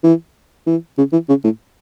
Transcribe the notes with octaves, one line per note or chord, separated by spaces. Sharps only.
E3
E3
C#3
E3
C#3
A2